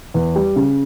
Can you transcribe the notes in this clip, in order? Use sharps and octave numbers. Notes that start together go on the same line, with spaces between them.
E2
G3
C#3